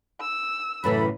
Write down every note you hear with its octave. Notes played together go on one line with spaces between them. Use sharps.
E6
F#2 A2 C#3 E3 A4 B5